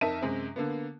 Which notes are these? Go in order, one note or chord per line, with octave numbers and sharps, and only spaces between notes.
F2 D#4 A#4 E5 A5 D#7
F#2 C3 G#3 C4
D3 A#3 B3